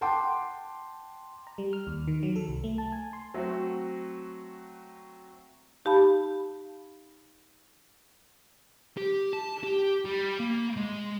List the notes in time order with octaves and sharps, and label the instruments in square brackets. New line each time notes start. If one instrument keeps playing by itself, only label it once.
[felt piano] F#5 G5 A5 C6 D6
[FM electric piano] A#5
G3
F6
D#2
D#3
F#3
A4
C2
A3
A5
G#5
C6
[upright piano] F#3 A3 C4 F#4
[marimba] D#4 G4 F5 A5 B5
[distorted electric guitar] G4
A5
G4
G3
A#3
G#3